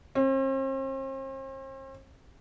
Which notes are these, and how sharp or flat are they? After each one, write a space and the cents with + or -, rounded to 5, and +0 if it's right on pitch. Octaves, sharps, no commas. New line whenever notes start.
C4 +45